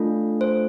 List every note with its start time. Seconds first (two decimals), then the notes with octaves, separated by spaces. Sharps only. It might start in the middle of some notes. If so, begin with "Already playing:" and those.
Already playing: A3 D4 F4 A4
0.41 C5